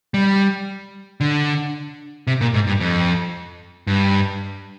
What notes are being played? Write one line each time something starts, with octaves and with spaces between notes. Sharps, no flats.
G3
D3
C3
A#2
G#2
G2
F2
G2